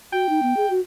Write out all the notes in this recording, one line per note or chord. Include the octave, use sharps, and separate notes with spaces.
F#4 G5
D#4
B3
G#4
F#4